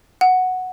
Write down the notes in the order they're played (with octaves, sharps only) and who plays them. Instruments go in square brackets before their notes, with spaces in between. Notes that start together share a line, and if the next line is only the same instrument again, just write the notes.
[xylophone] F#5